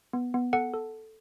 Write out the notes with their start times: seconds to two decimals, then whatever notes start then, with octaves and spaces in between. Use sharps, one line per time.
0.13 B3
0.34 B3
0.53 A4 F#5
0.73 A4